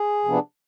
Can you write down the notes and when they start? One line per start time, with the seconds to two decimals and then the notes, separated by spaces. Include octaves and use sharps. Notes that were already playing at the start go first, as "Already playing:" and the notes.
Already playing: G#4
0.25 C3 F3 B3 D4